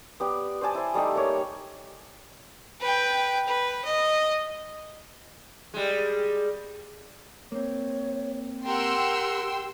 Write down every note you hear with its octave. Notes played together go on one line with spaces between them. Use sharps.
B3 G4 D5
C5 D5 G#5 A5
E4 C5
G3 A3 D#4 G4
A#3 C#5
B4 G5
B4
D#5
G3 G#3
A#3 C4 C#5
G4 A#4 F#5 G5 C6 E6